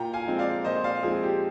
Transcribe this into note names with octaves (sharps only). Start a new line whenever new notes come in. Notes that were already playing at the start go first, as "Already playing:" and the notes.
Already playing: A#2 G5 A#5
F5 G#5
F3 G#3 C4
D5 F5
A#2 C5 D#5
D5 F5
F3 G#3 C4 G#4
G4